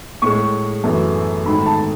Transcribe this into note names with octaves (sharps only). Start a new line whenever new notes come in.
A2 G#3 C#6
F#2 E3 A3
G#2 D#3 A3 B5
A5